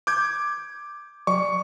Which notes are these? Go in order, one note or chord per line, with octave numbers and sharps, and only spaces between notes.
D6 G6 G#6
F#3 C#6